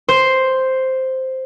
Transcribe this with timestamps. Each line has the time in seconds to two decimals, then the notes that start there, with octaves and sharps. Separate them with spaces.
0.09 C5